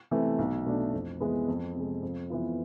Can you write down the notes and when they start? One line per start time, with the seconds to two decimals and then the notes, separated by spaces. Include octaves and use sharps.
0.11 C3 E3 A3
0.39 B1
0.66 B2 A3 D4
0.93 F2
1.20 E3 G#3 B3
1.48 F2
1.75 C3 G#3
2.03 F2
2.30 E3 B3 F4